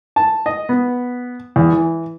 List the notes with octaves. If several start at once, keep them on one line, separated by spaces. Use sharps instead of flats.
A5
D#5
B3
E2
E3